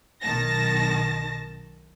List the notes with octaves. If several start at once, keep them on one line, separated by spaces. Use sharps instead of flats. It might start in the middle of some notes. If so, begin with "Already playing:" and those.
B1 D#3 A5 A#6